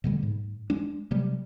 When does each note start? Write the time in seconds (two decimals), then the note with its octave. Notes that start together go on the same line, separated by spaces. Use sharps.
0.04 B2 D3 G3 A3
0.23 G#2
0.70 G#3 D4
1.11 C3 F#3 G3 A3